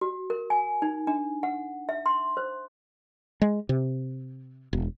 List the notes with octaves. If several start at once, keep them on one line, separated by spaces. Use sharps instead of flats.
F#4
A#4
G#5
D#4
D4
F#5
E5
C6
C5
G#3
C3
E1